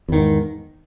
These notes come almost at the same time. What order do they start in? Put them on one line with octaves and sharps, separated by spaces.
E2 D#3 G#2